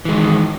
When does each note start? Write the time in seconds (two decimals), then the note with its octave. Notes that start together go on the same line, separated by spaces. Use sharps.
0.05 E3
0.09 G#3
0.12 D#3